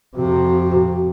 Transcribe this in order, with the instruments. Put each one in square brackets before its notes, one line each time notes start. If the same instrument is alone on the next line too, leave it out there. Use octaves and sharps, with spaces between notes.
[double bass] F2 C3 [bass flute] F#4